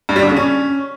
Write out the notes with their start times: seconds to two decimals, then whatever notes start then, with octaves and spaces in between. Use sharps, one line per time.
0.09 G2
0.16 G3
0.23 D3
0.30 C#3
0.36 C#4